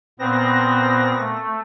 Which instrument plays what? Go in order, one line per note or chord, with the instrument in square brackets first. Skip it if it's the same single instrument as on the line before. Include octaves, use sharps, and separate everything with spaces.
[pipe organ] A#2 B3 A#6 [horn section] C4
[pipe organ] A3